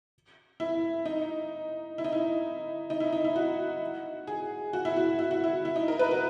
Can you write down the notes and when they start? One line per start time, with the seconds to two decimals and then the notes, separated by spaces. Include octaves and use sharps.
0.60 E4
1.06 D#4
1.98 E4
2.04 D#4
2.12 E4
2.90 D#4
3.00 E4
3.13 D#4
3.25 E4
3.36 F#4
4.27 G#4
4.73 F#4
4.85 E4
4.97 F#4
5.19 E4
5.31 F#4
5.44 E4
5.65 E4
5.76 D#4
5.88 A#4
5.99 B4
6.11 F#4